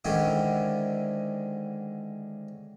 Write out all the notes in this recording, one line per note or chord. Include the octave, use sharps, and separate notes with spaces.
G#2 D3 D#3 C#4 E4 G4